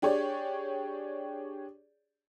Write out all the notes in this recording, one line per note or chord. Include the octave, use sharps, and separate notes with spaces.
D4 G4 G#4 C#5 D5